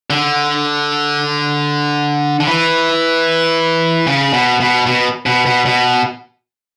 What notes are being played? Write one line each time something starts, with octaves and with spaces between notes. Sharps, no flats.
D3
D3
E3
C#3
B2
B2
B2
B2
B2
B2